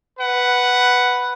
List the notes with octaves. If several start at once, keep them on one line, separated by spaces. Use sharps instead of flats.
B4 F#5